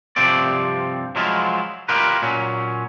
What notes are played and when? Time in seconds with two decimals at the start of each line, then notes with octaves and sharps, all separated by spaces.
0.16 G2 C3 F3 C4 D5
1.16 F3 F#3 G#3 E4 F4
1.89 E4 F4 G4 A#4 B4
2.22 A#2 F#3 C#4